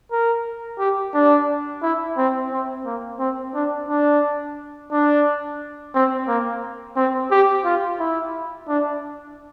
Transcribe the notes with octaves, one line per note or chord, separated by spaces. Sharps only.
A#4
G4
D4
E4
C4
C4
A#3
C4
D4
D4
D4
C4
A#3
C4
G4
F4
E4
D4